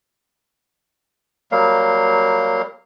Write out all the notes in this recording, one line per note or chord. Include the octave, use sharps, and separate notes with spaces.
F#3 G3 A#3 F5